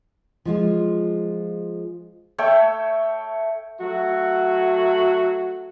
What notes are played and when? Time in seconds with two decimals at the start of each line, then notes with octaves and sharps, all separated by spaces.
0.45 F3 G#3 F4
2.38 A3 C#5 E5 G5
3.80 F#3 A3 F#4